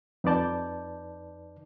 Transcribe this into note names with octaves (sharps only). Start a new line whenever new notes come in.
F2 D#4 B4 D5 A5 G6